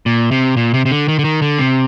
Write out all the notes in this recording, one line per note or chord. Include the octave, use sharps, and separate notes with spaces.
A#2
C3
A#2
C3
C3
D3
D#3
D3
D#3
D3
C3